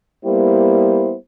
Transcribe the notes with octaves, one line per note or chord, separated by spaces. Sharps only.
G3 A#3 B3 E4 G4 C5